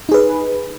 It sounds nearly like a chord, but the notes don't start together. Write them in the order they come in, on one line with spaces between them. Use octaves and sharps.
D#4 G#4 B4